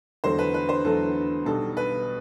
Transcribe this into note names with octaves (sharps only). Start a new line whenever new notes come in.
E2 D3 F#3 A3 C5
B4
B4
C5
E2 D3 F#3 A3 A4
B1 B2 G3 A4
B4